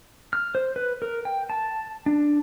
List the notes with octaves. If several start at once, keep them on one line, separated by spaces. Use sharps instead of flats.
F6
C5
B4
A#4
G5
A5
D4